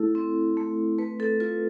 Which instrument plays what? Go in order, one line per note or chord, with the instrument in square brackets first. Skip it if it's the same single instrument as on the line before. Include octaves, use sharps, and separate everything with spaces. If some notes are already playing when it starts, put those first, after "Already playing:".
Already playing: [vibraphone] A3 E4 A4
C4
A3
A3 B4
A4
F4 B4